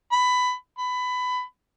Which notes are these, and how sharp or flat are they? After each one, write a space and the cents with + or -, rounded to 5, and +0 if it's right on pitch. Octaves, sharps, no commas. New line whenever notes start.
B5 +15
B5 +20